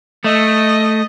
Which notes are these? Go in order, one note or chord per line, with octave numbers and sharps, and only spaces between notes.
A3 D#5